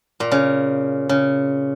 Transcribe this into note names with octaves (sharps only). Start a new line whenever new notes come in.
A#2
C#3
C#3